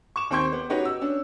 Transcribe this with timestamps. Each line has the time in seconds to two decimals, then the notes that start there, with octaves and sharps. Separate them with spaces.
0.16 C#6 D6 E7
0.30 D#2 C4 G5 C6 C#6 G6
0.53 B3
0.70 C#4 D#4 F#4 G4 B4 C#5
0.85 E6
1.01 C#4 D4